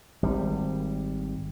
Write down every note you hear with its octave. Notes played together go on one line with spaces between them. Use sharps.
G#1 G3